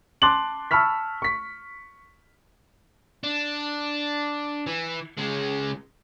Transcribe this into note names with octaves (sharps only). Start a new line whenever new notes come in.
A5 C6 D6 F#6 A6 F#7
A5 B5 C#6 E6 F6 B6
C#6 B6
D4
E3
C#3 G#3